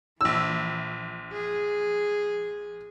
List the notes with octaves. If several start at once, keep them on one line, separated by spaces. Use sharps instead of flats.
A#1 E3 E6
G#4